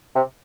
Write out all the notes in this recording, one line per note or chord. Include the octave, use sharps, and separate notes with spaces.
C3